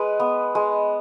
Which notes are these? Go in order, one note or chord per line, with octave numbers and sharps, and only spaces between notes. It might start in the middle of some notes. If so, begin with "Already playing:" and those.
Already playing: G#3 B4
B3
G#3